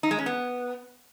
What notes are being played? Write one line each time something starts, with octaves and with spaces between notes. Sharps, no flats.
D#4
G#3
C#4
B3